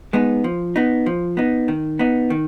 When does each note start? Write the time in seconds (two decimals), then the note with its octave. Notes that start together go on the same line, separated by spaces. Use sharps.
0.13 G#3 B3 D#4
0.44 F3
0.76 B3 D#4
1.06 F3
1.37 B3 D#4
1.68 D#3
1.99 B3 D#4
2.30 D#3